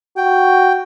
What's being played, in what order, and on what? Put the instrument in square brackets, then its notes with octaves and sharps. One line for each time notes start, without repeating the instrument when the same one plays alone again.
[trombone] F#4 [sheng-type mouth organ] G5